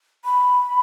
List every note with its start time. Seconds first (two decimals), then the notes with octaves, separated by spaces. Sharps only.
0.25 B5